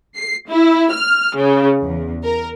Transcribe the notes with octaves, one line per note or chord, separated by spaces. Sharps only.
C7
E4
F6
C#3
E2
A#4